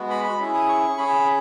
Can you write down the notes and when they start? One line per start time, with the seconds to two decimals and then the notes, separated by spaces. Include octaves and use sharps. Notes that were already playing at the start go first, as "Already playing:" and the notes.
Already playing: G#3 B3 F#4
0.10 B5
0.24 B5
0.39 C#4 E4 G#4
0.54 D#6
0.69 C#6
0.98 C#4 G#4 B5